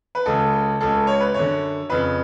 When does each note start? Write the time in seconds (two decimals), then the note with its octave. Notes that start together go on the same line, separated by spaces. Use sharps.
0.15 B4
0.26 C#2 C#3 A4
0.81 C#2 C#3 A4
1.07 C#5
1.20 B4
1.34 F#2 D3 C#5
1.90 F2 C#3 B4